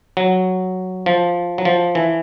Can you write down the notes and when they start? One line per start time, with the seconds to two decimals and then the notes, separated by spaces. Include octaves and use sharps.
0.17 F#3
1.06 F3
1.58 F#3
1.65 F3
1.95 E3